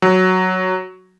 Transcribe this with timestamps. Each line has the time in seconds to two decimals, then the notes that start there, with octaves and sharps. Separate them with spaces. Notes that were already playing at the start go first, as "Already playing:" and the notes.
0.02 F#3